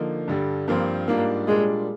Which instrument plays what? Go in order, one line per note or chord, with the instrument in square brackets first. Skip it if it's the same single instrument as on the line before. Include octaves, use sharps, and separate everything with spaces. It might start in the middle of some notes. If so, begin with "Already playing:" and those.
Already playing: [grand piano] D3 F3 A#3 D#4
G2 D3 G3
[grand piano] G2 F3 C4 F4 [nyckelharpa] A#3
[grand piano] G#2 G3 D4 F4 [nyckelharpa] A#3
[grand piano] A#2 G3 D4 F4 [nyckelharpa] G#3